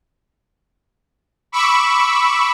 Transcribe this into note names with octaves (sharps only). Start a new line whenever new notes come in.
B5 C#6 D6 E6